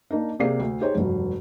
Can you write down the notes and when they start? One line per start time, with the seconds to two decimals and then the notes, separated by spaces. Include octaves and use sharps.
0.11 A#3 D4 D#4
0.40 C3 A#3 G#4 D5 F5 C7
0.60 D2
0.81 D#4 G4 G#4 C5 C#5
0.95 F1 G2 F#3